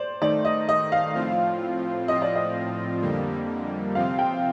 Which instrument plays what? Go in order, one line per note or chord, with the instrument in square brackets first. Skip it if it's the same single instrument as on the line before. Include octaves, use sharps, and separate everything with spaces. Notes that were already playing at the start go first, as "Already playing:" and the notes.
Already playing: [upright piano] C5 D5
[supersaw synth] D#3 A3 D#4 [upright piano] D5
[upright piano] D#5
D#5
F5
[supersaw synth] A2 F3 C4 F4
[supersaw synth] A2 F3 C4 F4 [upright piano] D#5
[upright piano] D5
D#5
[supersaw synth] F2 D3 G3 A#3
[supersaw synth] C3 F3 C4 F4 [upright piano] F5
[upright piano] G5